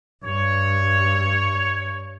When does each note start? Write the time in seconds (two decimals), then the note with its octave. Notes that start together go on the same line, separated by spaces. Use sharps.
0.25 G2 C#5